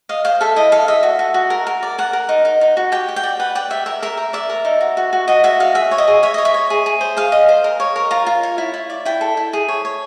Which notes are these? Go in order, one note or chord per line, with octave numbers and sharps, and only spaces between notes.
D#5 F5
C5 F5
A4 E5
E4 D#5
A4 F5
D#5 E5
F#4
F#4
F#4
A#4
A#4
D5
A#4 F#5
A#4
D#4
D#4
D#4
F#4
G4 G5
G4
G5
D5
B4 F#5
D5 G5
G4 E5
A#4 E5
A#4 E5
A#4
D5 E5
A#4
D#4
F#4
F#4
F#4
F#4 D#5
F#4 E5
F#4 F5
G#4 E5
C#5
D#5
G#4
C#5 E5
C#5 D#5
E5
C#5
G#4
G#4
C5
G#4 F5
D#5
C5
A#4
C#5
A#4
F4 A#5
F4
C#5
E4
E4
D5
E4 G5
A4
E4
G#4
C#5
C#5